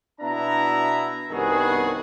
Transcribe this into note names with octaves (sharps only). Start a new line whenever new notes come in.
B2 B3 D4 E4 E5 A#5
C2 G2 D#3 B3 F#4 G#4